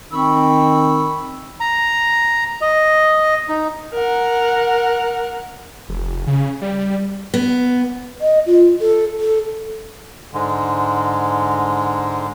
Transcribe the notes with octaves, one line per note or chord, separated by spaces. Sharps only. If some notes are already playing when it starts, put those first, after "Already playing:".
D#3 C4 B5 C#6 E6
A#5
D#5
D#4
A#4 F#5
F1
C#3
G3
B3
D#5
F4
A4
A4
G#2 D3 G#3